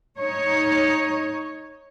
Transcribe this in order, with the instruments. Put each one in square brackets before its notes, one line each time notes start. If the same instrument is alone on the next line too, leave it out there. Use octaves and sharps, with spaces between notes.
[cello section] D#4 C#5